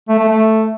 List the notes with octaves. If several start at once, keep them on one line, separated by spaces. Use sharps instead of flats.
A3
A3
A3